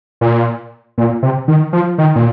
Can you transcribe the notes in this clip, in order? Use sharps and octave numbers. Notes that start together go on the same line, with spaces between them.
A#2
A#2
C3
D#3
F3
D#3
A#2